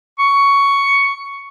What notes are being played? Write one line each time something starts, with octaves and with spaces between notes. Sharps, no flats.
C#6